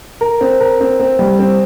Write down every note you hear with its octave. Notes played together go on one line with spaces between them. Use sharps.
A#4
C4
A#4
C4
C4
G3
C4